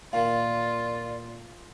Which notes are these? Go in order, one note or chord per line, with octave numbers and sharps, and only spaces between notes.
A#2 D#3 F4 D5 F5